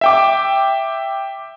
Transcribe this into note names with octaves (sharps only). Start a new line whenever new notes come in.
E5 G5 D6